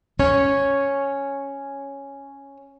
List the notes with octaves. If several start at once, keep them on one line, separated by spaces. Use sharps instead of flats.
C#4 C#5